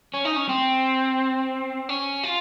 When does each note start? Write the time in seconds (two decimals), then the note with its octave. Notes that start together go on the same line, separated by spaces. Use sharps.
0.14 C#4
0.25 D#4
0.37 C#4
0.49 C4
1.89 C#4
2.23 F4